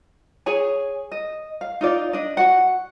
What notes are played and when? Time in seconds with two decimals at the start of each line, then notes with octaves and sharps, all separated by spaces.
0.46 G#4 C#5 G#5
1.12 D#5
1.61 F5
1.81 D#4 F4 D5
2.13 D4 D#5
2.37 F#4 F#5